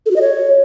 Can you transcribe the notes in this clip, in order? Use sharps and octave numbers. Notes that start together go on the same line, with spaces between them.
A4
F#4
D#5
C#5